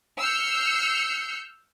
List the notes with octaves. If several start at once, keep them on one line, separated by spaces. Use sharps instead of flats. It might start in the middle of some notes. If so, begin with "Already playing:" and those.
E6 F6 G6 C7 C#7